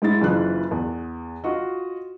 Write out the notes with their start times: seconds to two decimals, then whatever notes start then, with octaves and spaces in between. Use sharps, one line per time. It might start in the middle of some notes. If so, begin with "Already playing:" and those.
0.02 G#2 G#3 E4 A6
0.21 F#1 E3 D#4 F4 F#6
0.71 E2
1.44 F4 F#4 D#5